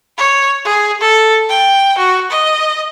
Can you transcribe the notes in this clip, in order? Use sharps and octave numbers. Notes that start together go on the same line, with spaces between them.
C#5
G#4
A4
G5
F#4
D#5